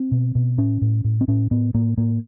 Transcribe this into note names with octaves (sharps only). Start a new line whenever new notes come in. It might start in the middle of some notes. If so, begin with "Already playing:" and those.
Already playing: C4
B2
B2
A2 C#4
A2
A2
C4
A2 C#4
A2 B3
A2 A#3
A2 A#3